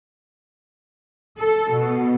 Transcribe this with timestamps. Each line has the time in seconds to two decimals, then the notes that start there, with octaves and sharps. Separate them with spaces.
1.38 A4
1.72 B2